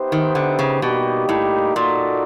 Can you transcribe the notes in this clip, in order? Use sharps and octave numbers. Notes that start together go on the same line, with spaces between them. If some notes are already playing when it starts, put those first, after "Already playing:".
Already playing: B3 D#4 G4 C5 E5
D#3
D3
C#3
B2 G3 A#3 D#4 G4
A2
A#2 A#3 D#4 F#4 A4 D5